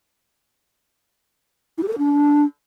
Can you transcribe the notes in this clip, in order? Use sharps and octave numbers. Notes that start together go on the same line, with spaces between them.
E4
G4
A4
A#4
D4